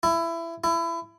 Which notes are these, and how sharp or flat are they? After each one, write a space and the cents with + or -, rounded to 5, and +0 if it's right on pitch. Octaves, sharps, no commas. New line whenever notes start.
E4 +20
E4 +25